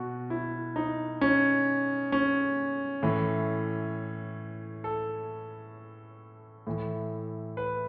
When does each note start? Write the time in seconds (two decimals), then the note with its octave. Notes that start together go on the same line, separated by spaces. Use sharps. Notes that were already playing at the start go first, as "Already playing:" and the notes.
Already playing: B2 F#4
0.30 E4
0.76 D#4
1.21 C#4
2.12 C#4
3.03 A2 E3
4.84 A4
6.67 A2 E3
7.57 B4